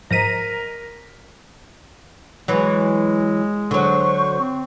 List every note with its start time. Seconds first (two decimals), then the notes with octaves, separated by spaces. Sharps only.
0.11 G#2 F3 A#4 D#5 A#5 A#6 B6 D#7
2.48 E3 F#3 G#3
3.71 D3 F#3 C5 C#6
4.38 C4